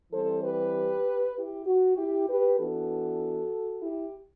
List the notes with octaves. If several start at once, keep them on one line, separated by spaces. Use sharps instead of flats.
E3 G3 C4 A4 C5
G4 B4
E4 G4
F#4
E4 G4
G4 B4
E3 B3 D4 F#4 A4
E4 G4